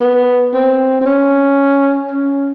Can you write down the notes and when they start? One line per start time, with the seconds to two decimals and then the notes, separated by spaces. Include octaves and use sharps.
0.01 B3
0.54 C4
1.01 C4
1.06 C#4
2.11 C#4